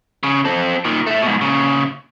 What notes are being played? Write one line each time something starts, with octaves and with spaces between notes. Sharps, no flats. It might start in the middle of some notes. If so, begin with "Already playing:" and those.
C#3
C4 A4
A#2 D#3
A3 E4
G#2 B2
A#2 C#3